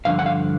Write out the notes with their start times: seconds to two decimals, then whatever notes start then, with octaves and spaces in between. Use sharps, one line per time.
0.05 G2 D3 F3 F5
0.19 F#5
0.26 F5